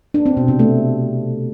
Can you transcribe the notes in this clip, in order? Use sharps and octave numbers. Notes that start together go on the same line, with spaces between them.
D4
C4
B2
C3
A3